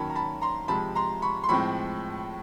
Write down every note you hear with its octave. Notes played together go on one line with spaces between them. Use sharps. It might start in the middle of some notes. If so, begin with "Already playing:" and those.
Already playing: D#3 F#3 A#3 C#4 A5 B5
A#5
A5 B5
A#5 C6
C3 F3 G#3 A5 B5
A#5 C6
B5 C#6
C6
A2 F3 G#3 C4 B5 C#6